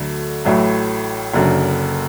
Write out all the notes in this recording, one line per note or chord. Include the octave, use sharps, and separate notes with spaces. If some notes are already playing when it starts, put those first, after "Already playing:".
Already playing: D2 D3 F#3 A3
A1 A2 F#3 A3
F#1 F#2 D3